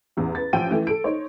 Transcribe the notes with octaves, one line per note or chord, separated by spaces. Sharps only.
A1 E2
B4 A6
A1 F3 C#4 G5 D#7
E3 A3
A4 D7
D#4 C5 C#5